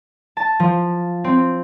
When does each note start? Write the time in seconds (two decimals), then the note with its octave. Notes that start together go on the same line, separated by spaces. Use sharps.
0.37 A5
0.60 F3
1.24 C4